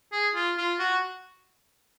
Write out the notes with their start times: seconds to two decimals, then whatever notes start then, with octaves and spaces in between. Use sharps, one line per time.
0.12 G#4
0.35 F4
0.57 F4
0.79 F#4